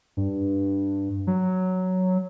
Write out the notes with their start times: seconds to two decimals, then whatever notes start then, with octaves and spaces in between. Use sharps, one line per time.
0.17 G2
1.27 F#3